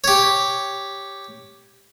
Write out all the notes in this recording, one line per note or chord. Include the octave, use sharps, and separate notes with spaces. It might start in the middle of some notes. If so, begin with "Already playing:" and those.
G4 C#5